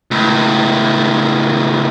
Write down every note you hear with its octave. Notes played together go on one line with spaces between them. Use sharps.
C#2 A2